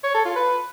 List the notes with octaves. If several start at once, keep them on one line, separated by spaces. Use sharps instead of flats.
C#5
A4
F4
B4